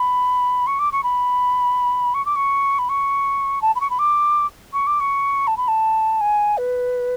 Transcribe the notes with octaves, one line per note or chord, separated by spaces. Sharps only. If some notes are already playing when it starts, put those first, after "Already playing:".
Already playing: B5
C#6
D6
C#6
B5
C#6
D6
C#6
B5
C#6
A5
B5
C#6
B5
D6
C#6
D6
C#6
A5
B5
A5
G#5
B4